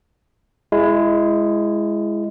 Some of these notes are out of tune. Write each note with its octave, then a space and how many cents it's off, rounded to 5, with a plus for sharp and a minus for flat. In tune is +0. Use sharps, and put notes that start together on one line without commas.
G#3 +0 E4 +20